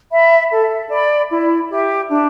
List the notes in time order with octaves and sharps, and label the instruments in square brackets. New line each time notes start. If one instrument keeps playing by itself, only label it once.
[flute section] E5 B5
A4
D5 B5
E4
G4 E5
D4